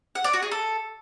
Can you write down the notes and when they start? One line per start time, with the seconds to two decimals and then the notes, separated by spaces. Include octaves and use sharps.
0.15 F#5
0.24 D5
0.33 F#4
0.42 G#4
0.52 A4